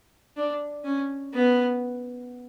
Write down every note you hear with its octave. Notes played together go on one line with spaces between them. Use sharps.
D4
C#4
B3